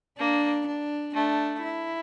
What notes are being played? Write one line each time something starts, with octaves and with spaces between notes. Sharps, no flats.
A#3 D4
D4
A3 D4
E4